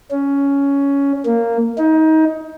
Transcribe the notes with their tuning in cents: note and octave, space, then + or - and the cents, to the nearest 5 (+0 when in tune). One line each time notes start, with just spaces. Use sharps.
C#4 +10
A#3 -10
D#4 +25